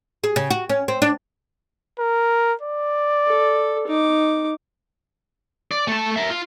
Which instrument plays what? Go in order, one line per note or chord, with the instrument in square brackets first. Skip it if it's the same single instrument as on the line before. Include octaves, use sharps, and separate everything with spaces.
[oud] G#4
C#3
F#4
C#4
C4
D4
[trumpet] A#4
D5
[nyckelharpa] A4
D#4 D6
[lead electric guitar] D5
A3 A5
A#4 E5
F4